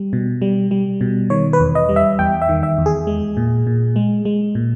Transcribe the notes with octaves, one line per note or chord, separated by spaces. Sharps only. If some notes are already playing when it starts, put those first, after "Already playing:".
Already playing: G3
B2
G3
G3
B2
D#3 C#5
B4
E2
D#5
G3
E5
E2 G5
E5
D#3
E5
E2
G#4
G#3
A#2
A#2
G#3
G#3
A#2